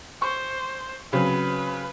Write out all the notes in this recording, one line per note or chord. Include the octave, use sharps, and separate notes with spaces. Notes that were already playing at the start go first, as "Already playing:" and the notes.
C5 C#6
C#3 F#3 C4 B4